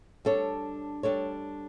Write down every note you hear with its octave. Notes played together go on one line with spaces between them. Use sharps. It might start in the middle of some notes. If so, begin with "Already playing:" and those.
G3 D4 A4 C#5
G3 D4 A4 C#5